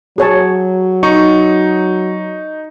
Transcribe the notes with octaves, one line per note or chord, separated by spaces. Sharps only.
F#3 G#4 C#5 A5
D#4 C#6